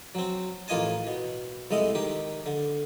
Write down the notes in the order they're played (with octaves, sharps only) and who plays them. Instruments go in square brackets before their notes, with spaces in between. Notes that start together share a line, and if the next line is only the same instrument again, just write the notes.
[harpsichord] F#3 C4
A1 A#3 F4 D#5 G#5 A5
B2
C2 G#3 A3 D#5
D#3 G4
D3